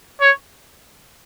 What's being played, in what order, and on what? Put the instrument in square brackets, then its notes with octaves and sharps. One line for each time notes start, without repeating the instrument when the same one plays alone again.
[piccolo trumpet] C#5